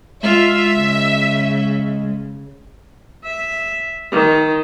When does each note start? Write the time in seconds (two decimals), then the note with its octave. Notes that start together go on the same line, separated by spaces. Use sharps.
0.23 G#3 F4 E5
0.75 C#3
3.24 E5
4.12 D#3